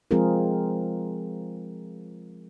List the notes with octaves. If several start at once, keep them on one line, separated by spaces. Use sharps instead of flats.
F3 G#3 C4 F4 G#4 A#4